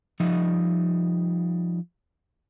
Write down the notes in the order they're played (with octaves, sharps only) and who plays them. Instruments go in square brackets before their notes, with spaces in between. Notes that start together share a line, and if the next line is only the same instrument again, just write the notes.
[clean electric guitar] F3 G3 D#4 D#5 E5